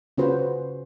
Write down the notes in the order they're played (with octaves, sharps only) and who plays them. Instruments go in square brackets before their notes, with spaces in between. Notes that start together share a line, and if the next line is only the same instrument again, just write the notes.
[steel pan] C#3 C#4 F4 F#4 B4 C5